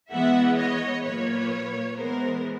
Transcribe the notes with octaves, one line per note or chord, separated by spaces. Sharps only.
E3 G#3 B3 E5 F#5
C#5 D#5
A#2 F#3 A#3 B4 C#5
E3 G#3 B3 A#4 C5